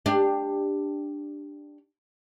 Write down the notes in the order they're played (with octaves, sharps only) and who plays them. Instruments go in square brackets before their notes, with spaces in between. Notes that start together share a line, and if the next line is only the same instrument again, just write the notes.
[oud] D4 G4